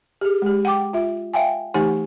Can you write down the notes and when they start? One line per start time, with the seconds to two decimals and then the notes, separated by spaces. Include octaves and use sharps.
0.21 G4 G#4
0.42 G#3 G4
0.65 F#5 G5 D6
0.93 F4 E5
1.34 E5 F5 G5 G#5
1.74 E3 A3 D#4 G4 F#5 G#5